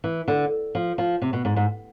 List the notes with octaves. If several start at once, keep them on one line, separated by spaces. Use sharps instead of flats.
E3
D3
F3
F3
C3
B2
G#2
G#2